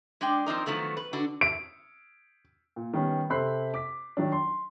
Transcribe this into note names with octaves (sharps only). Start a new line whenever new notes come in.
G#3 D4 D5 G5
F3 C4 D#4 A#4
D#3 F3 F#3 A3 B3
B4
D3 D4 F#4
D7
A#2
D#3 G3 B3 C#4
C3 A4 C5 B5 F#6 C7
D6 B6
D#3 F#3 D4
C6